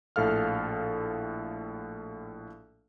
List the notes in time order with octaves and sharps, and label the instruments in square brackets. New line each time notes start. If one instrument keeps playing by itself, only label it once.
[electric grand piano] A#1 A2 A4 F5 F6